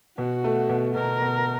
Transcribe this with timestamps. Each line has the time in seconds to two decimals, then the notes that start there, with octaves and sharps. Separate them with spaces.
0.18 B2 F#4
0.44 A3
0.69 B2
0.96 B2 A#4
1.22 B2